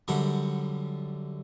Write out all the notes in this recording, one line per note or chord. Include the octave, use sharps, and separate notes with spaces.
F#2 D3 G3 F#5